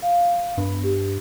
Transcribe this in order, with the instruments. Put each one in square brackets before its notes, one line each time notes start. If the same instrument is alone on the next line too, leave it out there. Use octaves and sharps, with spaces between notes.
[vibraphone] F5
[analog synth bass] G2 [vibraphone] B3
[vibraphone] G4